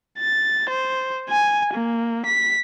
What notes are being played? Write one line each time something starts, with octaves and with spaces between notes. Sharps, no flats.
A6
C5
G#5
A#3
B6